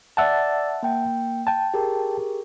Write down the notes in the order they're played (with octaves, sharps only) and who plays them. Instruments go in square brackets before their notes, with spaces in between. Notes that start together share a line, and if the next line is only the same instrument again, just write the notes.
[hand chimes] D5 E6 A6 [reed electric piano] E5 F#5 A5
[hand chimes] A#3 G5
[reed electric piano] G5 A5
[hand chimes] G4 G#4 A#4